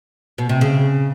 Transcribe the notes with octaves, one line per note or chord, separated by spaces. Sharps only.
B2
C3
C#3